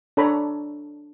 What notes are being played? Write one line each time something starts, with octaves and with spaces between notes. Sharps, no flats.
D4 A4 C#5 A#5 B5